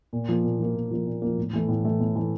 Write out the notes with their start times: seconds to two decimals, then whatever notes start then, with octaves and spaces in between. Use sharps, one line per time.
0.13 A#2
0.29 F3 A#3
0.44 A#2
0.59 F3 A#3
0.75 A#2
0.91 F3 A#3
1.07 A#2
1.22 F3 A#3
1.38 A2
1.53 E3 A3
1.69 A2
1.84 E3 A3
2.00 A2
2.16 E3 A3